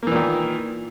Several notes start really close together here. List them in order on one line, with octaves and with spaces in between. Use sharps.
A#3 E3 A#2 D#3